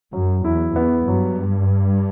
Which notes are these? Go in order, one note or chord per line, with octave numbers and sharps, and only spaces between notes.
F#2 F#3
E2 E4
E2 B3
G2 F#3